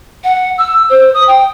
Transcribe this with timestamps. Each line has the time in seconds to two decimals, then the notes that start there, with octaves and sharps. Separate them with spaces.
0.23 F#5
0.58 E6
0.90 C5
1.14 D#6
1.27 G5